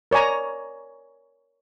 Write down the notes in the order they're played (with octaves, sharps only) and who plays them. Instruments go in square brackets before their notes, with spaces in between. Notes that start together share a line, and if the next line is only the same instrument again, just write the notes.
[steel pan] A#4 C#5 D5 G#5 A#5